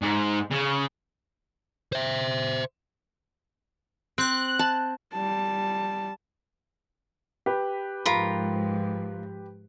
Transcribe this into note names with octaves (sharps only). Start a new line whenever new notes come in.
G#2
C#3
C5 E5
C4 F#6
A5
G3 A5
G4 B4
G#2 F3 F4 A#4 B5